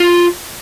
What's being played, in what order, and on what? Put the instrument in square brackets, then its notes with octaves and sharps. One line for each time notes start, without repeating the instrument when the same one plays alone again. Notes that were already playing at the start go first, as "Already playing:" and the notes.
Already playing: [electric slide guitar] F4